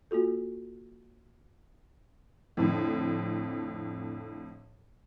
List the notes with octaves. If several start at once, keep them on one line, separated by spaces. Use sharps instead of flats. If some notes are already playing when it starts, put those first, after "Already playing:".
A#3 F4 F#4 A4
F2 A2 D3